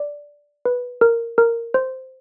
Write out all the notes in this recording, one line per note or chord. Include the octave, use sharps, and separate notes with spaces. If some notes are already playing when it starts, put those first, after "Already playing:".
Already playing: D5
B4
A#4
A#4
C5